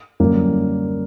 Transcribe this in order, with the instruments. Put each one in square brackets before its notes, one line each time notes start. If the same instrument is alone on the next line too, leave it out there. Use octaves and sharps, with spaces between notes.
[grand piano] F#2 D3 F#3 G3 A#3